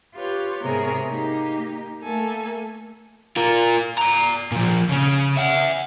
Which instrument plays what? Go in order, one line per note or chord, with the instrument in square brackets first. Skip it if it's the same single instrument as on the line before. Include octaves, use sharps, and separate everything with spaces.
[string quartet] F4 G4 B4 C#5
G#2 C3 B3 G#4 A#4 C#5
A#3 D#4 G4
A3 A#3 A4 G#5
[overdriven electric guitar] F4 A#4
D5 A#5
A#2 F3
C#3 C#4
E5 F#5